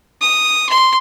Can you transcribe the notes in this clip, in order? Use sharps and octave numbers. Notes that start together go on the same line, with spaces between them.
D#6
C6